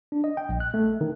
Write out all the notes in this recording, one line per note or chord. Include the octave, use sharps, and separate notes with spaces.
D4
D#5
G5
A#1
F#6
A3
D#3